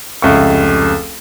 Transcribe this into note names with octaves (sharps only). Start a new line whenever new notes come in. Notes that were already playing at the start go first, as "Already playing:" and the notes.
F1 C#2 E5 C#6